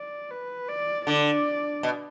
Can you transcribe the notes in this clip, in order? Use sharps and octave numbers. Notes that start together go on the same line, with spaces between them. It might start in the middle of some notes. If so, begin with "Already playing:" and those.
Already playing: D5
B4
D5
D3 D5
B2